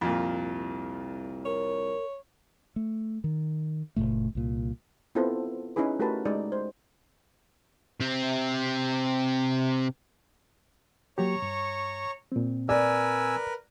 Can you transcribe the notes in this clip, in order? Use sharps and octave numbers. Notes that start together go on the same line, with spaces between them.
C2 F2 A#2
A#4 C#5
A3
D#3
F#1 C#2 A#2 A3
C2 A#2
B3 C4 E4 F4 A4 C5
C#4 D#4 E4 G#4 B4
A3 F#4 G4 A#4 B4 A5
G#3 D#4 D5
C5
C3 C4
F#3 A#3 G4 C#5 A#5 C#6
G2
A#2 C4
A#4 B4 D5 G#5 E6